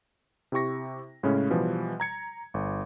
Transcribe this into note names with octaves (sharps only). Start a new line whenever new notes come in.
C3 E4 G4 C#6 A#6
A2 C#3 G#3 C#4
B2 E3 F3 G3
A#5 G#6 C#7
G1